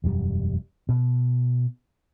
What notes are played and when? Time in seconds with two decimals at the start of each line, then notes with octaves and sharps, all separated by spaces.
0.04 E1 F#2 G3
0.89 B2